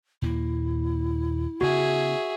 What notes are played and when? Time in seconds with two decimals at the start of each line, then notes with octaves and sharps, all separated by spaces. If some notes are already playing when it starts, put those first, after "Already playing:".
0.22 D#2 A#2 A#3 E4
1.61 C#3 B3 F#4 G#4 E5